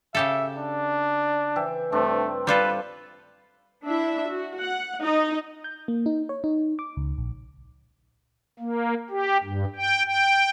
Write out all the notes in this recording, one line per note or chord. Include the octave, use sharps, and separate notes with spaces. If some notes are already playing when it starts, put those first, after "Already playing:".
C#3 G4 A4 E5
D4
E3 E5 G5
G2 A3 C4 D4
G3 F4 A4 B4
D4 E4 E5
F#4
F#5
D#4 D#5
G6
A#3
D#4
C#5
D#4
D6
C#2
A#1
A#3
G4
G2
G5
G5